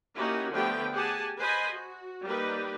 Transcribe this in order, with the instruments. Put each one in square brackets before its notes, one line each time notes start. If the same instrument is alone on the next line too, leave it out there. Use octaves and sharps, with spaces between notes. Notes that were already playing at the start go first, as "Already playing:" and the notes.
[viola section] A#3 C#4 D#4 E4 F#4 G4
D3 F3 A3 B3 G4 G5
G4 G#4 F#5 G#5 A5
B4 C5 D#5 G#5 B5
F#4
G3 A#3 D#4 G4 B4